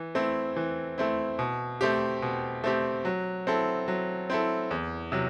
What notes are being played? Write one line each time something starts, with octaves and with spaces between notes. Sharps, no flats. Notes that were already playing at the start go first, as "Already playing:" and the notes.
Already playing: E3
A3 C4 E4
E3
A3 C4 E4
B2
A3 C4 G4
B2
A3 C4 G4
F#3
C4 E4 A4
F#3
C4 E4 A4
E2
C3 F#3